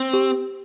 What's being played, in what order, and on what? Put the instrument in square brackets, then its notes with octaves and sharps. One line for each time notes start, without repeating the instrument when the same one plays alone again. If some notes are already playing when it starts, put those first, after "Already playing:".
Already playing: [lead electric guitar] C4
[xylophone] G4